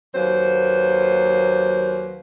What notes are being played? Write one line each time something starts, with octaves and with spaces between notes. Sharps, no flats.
D#2 F#3 A#3 B4 C5